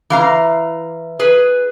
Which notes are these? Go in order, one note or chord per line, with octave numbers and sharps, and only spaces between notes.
E3 F5 A#5
G#4 B4